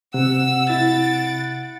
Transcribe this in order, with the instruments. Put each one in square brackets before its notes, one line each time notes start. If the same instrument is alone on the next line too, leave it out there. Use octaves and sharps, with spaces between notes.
[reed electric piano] C3 [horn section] F#5 [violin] E6
[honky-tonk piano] E4 [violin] A6 D7